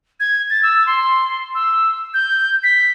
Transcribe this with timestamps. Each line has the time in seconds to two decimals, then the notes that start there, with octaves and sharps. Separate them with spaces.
0.20 G#6
0.50 A6
0.63 E6
0.87 C6
1.55 E6
2.14 G6
2.64 B6